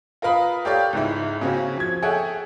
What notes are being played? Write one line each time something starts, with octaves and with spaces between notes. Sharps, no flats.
F4 A#4 B4 F5 B5 D#6
G4 A4 C#5 D5 F5 G5
C#2 G#2 E4
C#3 F#3 A#3 C4 C#4 F#4
F3 G#6
G#4 A4 C#5 E5 F#5 G5